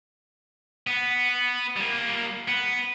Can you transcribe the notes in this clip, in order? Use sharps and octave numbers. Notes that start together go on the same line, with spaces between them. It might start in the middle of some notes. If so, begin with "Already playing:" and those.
B3
G3 A#3
B3